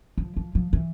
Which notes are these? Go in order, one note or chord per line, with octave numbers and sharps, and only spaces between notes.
F3
F3
F3
E3